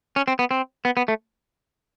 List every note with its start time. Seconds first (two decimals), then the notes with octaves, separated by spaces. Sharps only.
0.16 C#4
0.28 C4
0.39 B3
0.51 C4
0.85 B3
0.97 B3
1.08 A3